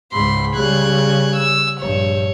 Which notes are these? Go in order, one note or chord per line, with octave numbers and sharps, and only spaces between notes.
C#2 G#2 B5 C6
C#3 G3 F#6 G#6
E6
A#1 G2 C#5